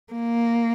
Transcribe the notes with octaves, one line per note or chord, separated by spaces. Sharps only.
A#3